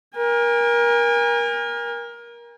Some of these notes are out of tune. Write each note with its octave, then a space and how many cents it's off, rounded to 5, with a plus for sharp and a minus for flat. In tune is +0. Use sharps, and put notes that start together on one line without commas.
A#4 +25 G#5 -35